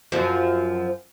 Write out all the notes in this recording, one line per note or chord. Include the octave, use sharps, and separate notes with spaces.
F#2 F3